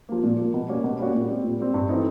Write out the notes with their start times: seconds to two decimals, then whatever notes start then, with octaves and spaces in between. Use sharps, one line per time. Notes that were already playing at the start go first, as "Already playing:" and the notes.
0.09 F3 A#3
0.23 A#2
0.38 F3 A#3
0.54 B2
0.69 G3 A#3 C#4 F#4
0.84 B2
0.99 G3 A#3 C#4 F#4
1.14 A#2
1.29 G3 C4
1.44 A#2
1.60 G3 C4
1.74 G2
1.89 E3 A3 C4 D#4